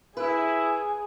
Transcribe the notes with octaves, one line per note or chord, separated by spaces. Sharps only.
E4 G#4 B4